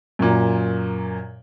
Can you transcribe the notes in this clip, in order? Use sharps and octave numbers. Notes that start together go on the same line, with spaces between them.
F#2 A#2